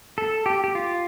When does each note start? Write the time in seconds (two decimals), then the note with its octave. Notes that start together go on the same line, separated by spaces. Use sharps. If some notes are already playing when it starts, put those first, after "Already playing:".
0.18 A4
0.46 G4
0.64 G4
0.75 F4